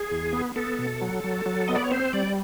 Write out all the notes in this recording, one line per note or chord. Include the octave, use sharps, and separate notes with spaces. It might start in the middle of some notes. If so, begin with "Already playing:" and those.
Already playing: G#4
E2
B3
B3 A4
B2
F#3
F#3
F#3
B3 D#5
D5
C#5
C4 C5
G3 D5